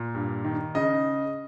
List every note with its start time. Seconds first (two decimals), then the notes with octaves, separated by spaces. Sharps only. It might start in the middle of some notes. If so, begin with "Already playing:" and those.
Already playing: A#2
0.14 G2
0.45 D#3
0.75 C#3 D#5